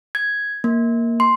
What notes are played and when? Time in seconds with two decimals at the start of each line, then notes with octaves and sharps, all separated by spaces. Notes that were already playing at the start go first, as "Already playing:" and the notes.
0.15 G#6
0.64 A#3
1.20 C6